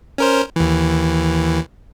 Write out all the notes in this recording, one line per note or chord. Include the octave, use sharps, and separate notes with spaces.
C#4 A#4 C5
D#2 E3